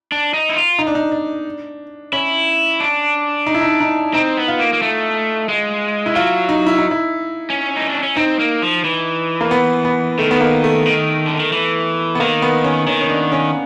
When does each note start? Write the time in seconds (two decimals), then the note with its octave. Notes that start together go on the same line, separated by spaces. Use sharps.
0.12 D4
0.34 D#4
0.49 E4
0.56 F4
0.79 D#4
0.87 D4
0.95 D#4
1.12 D4
2.12 C#4 E4
2.80 D4
3.47 D#4
3.54 E4
3.61 D#4
3.80 D#4
4.14 C4 D#4
4.37 B3
4.48 F4
4.60 A#3
4.73 A#3
4.82 A3
5.49 G#3
6.06 E4
6.15 F#3 F4
6.49 D#4
6.67 E4
6.78 D#4
6.91 E4
7.50 C#4
7.76 D#4
7.89 D4
8.03 C#4
8.16 C4 D#4
8.39 A#3
8.62 F3
8.84 E3
9.41 A#3
9.51 B3
9.85 B3
10.18 D#3 A3
10.31 B3
10.41 A#3
10.64 A3
10.86 D#3
11.27 D3
11.40 D#3
11.52 E3
12.15 B3
12.20 D#3 A#3
12.42 B3
12.64 C#4
12.87 D#3 C#4
13.01 C#4
13.09 D4
13.32 C#4